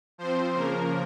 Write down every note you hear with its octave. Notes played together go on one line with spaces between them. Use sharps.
F3 C4 C5
C#3 F3 A#3 A#4